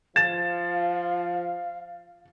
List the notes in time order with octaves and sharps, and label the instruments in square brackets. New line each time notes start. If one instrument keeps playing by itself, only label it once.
[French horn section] F3 [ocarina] F5 [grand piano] A6 E7